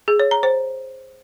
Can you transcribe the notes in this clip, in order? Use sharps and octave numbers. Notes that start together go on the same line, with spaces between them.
G#4
C#5
A#5
C5